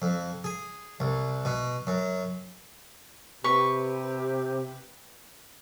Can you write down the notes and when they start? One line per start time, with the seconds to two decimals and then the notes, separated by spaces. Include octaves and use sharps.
0.02 F2
0.44 G#4
1.00 C2
1.45 B2
1.87 F#2
3.44 C3 G4 B4 C#6